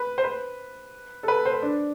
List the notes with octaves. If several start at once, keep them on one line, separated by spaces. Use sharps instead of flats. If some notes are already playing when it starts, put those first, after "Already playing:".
Already playing: B4
C5
B4
A4
B4
C5
B4
D4